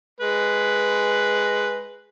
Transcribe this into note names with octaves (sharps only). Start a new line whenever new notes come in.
G#3 B4